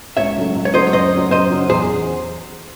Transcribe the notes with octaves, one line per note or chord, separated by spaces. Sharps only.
C#2 C#5 E5
C#3 F#3 A3
C#2
C#5
C#3 F#3 A3 C5 D#5
C#5
F#2 C5 D#5
C#3 F#3
F#2 C5 D#5
C#3 F#3
E2 G#4 C5